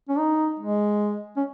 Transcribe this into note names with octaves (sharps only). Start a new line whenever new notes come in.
C#4
D#4
G#3
C#4